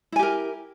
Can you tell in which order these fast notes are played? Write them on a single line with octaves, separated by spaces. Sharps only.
E4 G#5 G4 A#4